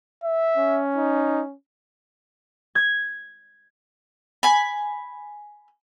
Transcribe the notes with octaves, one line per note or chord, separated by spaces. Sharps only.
E5
C#4
D#4
G#6
G#5 B5